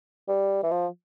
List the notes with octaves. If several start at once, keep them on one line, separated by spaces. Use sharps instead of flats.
G3
E3
F3